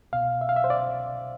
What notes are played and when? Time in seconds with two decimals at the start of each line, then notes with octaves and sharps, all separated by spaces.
0.12 C2 B2 F5
0.41 E5
0.49 F5
0.56 E5
0.64 C5
0.70 D5